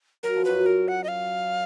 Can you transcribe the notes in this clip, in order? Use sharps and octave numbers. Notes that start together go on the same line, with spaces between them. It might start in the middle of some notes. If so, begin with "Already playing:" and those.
F#3 A#4
F3
F#2 F#3 B4
A#4
F#5
D#5
F5